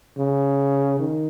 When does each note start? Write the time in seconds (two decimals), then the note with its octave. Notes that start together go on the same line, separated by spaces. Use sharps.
0.18 C#3
0.99 D#3